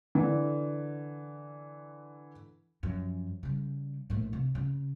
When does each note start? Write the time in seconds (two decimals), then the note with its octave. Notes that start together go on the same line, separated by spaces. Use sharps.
0.15 D3 E3
2.83 F#2 F3
3.43 C#3 G3
4.10 A#1 A2
4.33 C3
4.55 C#3